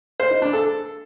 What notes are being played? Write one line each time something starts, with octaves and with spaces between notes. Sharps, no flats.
C5
D#4
D4
A4